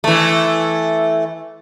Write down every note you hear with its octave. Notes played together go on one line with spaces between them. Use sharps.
E3 A3